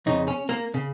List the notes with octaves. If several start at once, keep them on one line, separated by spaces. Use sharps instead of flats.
F2 C#3 D#4
C#4
A#3
C#3